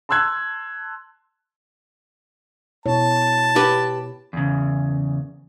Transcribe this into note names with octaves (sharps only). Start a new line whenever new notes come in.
A5 C6 E6 F#6 G#6
B2 E4 C#5 A5
G4 B4
E2 C#3